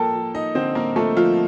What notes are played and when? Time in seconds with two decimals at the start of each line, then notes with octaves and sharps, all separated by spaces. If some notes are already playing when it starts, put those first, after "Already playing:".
Already playing: F3 A#3 A4 A#4 G5 A5
0.14 F3
0.34 D#4 D#5
0.55 D3 C4 C5
0.75 A#3 A#4
0.96 F3 A3 A4
1.17 F3 F4